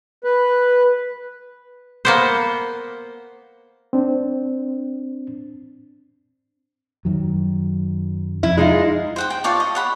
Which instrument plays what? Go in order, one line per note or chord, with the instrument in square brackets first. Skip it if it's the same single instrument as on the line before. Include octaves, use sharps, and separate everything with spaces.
[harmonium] B4
[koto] A#3 B3 C5
[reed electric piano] C4 D4
[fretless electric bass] F#2 D#3 F#3
[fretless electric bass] F2 [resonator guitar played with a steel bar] E4
[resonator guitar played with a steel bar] G#3 D#4 F4
[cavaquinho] C5 F#5 G5
G5
F4 C#5 D5 A5
D#5
C#5 F#5 B5